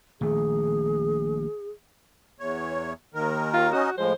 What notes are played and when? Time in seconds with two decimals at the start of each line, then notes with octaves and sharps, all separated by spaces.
0.21 A#1 D#3 A3 G#4
2.40 E2 C#5
3.14 D#2 D#3 A#4
3.54 F4
3.73 C#4 D#4 F#4 D#5
3.98 A2 F3 G#3 C5